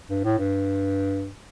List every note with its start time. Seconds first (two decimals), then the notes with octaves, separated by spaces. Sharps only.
0.09 G2
0.24 A2
0.39 G2